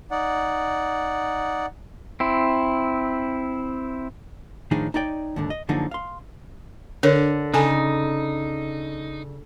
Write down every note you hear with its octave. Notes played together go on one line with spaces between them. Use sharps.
D#4 D5 F#5
C4 E4
A2 D#3 F3 D4 D#4 G#4
D#4 C#5 D5 G5
D#2 G#2 D3
D#5
F#2 D3 F3 A#3 D#4 G#4
F5 C6
D3 A#4 C#5
C#3 D#4 A4 G#5 A5